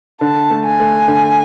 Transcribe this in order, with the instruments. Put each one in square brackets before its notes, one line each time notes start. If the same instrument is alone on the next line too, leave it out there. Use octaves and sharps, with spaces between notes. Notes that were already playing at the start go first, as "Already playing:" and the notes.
[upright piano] D3 [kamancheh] A5
[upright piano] A3
[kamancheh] G#5
[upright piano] A3
D3